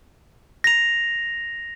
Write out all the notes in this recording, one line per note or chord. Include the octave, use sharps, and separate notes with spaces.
A#6 F7